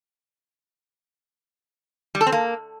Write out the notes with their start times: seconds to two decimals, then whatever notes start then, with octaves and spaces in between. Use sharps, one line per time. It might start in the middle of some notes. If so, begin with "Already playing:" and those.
2.15 G3
2.21 A4
2.26 C4
2.32 A#3